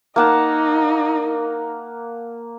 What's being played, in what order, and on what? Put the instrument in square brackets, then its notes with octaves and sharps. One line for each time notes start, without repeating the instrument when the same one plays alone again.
[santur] A#3 F#5 A5 [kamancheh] D#4